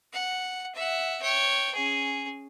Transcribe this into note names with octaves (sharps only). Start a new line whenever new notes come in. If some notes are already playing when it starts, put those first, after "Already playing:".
F#5
E5 F#5
C#5 G5
C#4 G#4